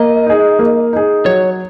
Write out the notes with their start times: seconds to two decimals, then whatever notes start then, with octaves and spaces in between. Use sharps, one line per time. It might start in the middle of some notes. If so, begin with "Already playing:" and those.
Already playing: A#3 D#5
0.27 D#4 G#4
0.59 A#3
0.93 D#4 G#4
1.26 F#3 C#5